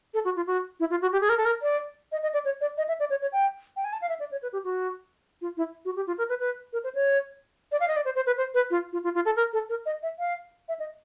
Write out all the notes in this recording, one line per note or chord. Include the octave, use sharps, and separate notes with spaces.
A4
F#4
F4
F#4
E4
F4
F#4
G4
G#4
A#4
A4
A#4
D5
D#5
D#5
D5
C#5
D5
D#5
E5
D5
C#5
C#5
G5
G5
G#5
A5
F5
E5
D5
C#5
B4
G4
F#4
F4
E4
F#4
G4
F4
A#4
B4
B4
A#4
C5
C#5
D5
F5
D#5
D5
C5
C5
B4
C5
B4
F4
F4
F4
F4
A4
A#4
A4
A#4
D#5
E5
F5
E5
D#5